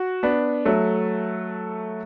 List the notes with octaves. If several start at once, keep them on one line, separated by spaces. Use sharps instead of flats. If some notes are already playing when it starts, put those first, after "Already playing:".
Already playing: F#4
B3 D4
F#3 A3